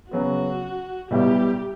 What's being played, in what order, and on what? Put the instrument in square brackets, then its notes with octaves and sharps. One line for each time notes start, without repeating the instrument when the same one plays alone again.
[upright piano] C#3 F#3 B3 [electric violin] F#4
[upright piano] B1 B2 G3 B3 E4 [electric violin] G4